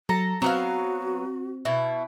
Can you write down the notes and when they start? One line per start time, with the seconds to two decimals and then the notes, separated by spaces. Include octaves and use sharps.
0.09 F#3 A4 A#5 A#6
0.42 F#3 B3 C4 F#4 F5
1.65 B2 E4